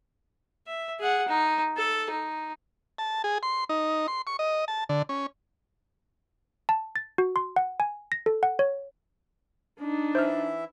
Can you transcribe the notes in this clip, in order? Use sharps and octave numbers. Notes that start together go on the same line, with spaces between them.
E5
G#4 F#5
D#4
A4
D#4
A5
G#4
C6
D#4
C6
C#6
D#5
A5
D3
C#4
A5
A6
F#4
C6
F#5
G#5
A#6
A4
F#5
C#5
D4 D#4
E3 E4 C5 E5 F6